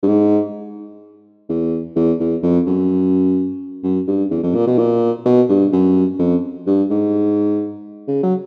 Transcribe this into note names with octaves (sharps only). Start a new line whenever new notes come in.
G2
G#2
E2
E2
E2
F2
F#2
F#2
G2
E2
F2
A#2
B2
A#2
B2
G2
F#2
F2
G2
G#2
C#3
F#3